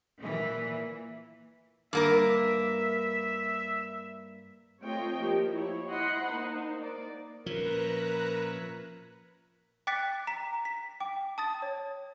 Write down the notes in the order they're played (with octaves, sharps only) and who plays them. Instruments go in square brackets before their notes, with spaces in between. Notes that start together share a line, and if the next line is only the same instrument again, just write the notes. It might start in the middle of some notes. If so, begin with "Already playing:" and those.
[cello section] A#2 E3 A#3
[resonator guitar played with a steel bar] G2 A#3 A#4 [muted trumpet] E5
[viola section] A3 C4 F4 C#5 D#5 G5
F3 A#3 G4
E4 C#5
E4 D#5 F#5 B5 C6
A#3 D#4 C5
A#3 D5
[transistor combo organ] A#2 C#4 E5 [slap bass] F3 [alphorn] A#4 [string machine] B4 A#5 F#6
[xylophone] G5 D6 F#6 A6 B6 C#7
A#5 B6
B6
G5 D6
A5 D#6 A6
C#5